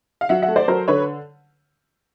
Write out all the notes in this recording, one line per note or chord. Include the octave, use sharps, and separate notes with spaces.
F5
F#3 E5 F#5
E5 F#5
A3
C5 D5
F#3 A#4 C5
D3 B4 C#5